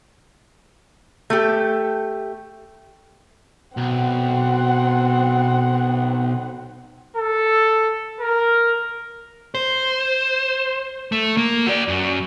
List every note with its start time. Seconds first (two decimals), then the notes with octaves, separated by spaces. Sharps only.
1.30 A3 G4
3.77 B1 C4 F#5
7.16 A4
8.20 A#4
9.55 C5
11.12 A3
11.37 A#3
11.67 F#4 D5
11.88 F#2